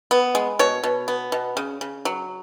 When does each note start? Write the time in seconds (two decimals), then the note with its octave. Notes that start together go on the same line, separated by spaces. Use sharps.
0.11 B3
0.35 G#3
0.59 B2 C#5
0.84 B2
1.08 B3
1.32 B2
1.57 C#3
1.81 C#3
2.05 F#3